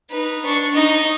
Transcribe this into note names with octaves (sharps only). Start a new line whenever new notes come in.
D#4 B4
D4 C#6
D#4 D#5